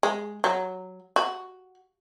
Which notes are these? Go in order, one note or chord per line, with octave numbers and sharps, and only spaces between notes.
G#3
F#3
F#4